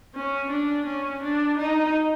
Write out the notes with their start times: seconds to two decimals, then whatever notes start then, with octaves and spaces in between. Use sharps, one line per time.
0.15 C#4
0.51 D4
0.86 C#4
1.22 D4
1.58 D#4